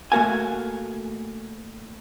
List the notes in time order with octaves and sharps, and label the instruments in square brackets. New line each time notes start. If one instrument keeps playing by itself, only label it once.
[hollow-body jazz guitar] A3 A#3 F#4 A#4 F5 G#5